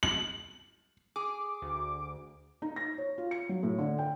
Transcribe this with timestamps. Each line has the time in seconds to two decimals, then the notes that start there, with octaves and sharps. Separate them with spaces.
0.03 F#7
1.16 G#4 D6
1.62 D2
2.62 D#4
2.76 A#6
2.98 C#5
3.18 F4
3.31 C#7
3.49 F#3
3.63 A2
3.78 D3
3.99 G5